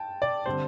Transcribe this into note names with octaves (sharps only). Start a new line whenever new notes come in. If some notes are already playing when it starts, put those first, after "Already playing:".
Already playing: G5 A5
D5
D3 G3 C4 C5